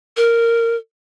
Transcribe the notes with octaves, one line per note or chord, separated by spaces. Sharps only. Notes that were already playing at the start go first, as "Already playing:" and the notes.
A#4